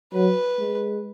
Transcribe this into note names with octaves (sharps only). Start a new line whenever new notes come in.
F#3 B4
G#3